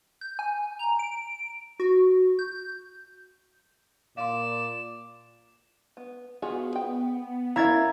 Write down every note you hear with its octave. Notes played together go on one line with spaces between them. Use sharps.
G6
G#5
A#5
D7
F#4
G6
A#2 D5 F5 C6 E7
B3
B3 F4 F#4 G#4
G5
C#4 E4 A#4 E5 F5 A#5 G#6 A6